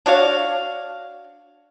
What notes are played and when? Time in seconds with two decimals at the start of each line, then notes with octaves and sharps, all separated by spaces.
0.06 D4 F#4 C#5 F5